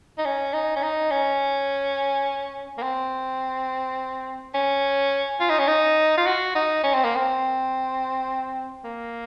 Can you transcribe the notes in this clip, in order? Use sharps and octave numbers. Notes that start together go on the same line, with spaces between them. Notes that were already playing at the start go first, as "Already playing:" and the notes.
D#4
C#4
D#4
C#4
D#4
C#4
A#3
C4
C#4
F4
D#4
C#4
D#4
F4
F#4
D#4
C#4
C4
A#3
C4
A#3